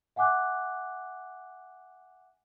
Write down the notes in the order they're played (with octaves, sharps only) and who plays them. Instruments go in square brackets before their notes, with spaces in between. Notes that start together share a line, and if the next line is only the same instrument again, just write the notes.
[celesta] E5 F#5 G#5 D6 F#6